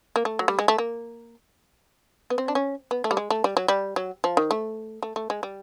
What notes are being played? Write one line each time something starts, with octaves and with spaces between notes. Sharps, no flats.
A#3
A3
F#3
G3
G#3
A3
A#3
B3
C4
D4
C#4
B3
A3
G3
G#3
A3
G3
F#3
G3
F#3
F3
D#3
A3
A3
A3
G#3
G3